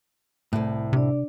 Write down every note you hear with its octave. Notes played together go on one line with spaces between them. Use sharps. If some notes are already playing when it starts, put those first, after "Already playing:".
C2 A2
C3 D4 D5